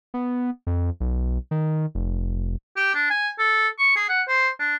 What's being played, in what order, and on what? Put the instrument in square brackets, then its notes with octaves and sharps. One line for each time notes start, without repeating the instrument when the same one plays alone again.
[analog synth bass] B3
F2
B1
D#3
F1
[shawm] G4
D4
G#5
A4
C#6
G#4
F#5
C5
D4